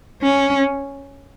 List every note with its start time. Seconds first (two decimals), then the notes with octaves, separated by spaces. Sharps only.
0.23 C#4